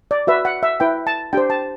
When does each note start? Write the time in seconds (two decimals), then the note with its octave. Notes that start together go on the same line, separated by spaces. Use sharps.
0.11 D5
0.27 F#4 B4 E5
0.45 F#5
0.63 E5
0.80 E4 B4 G5
1.07 A5
1.33 D4 G4 C5 G5
1.50 A5